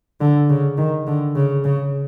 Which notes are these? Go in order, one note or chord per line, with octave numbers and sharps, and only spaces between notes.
D3
C#3
D#3
D3
C#3
C#3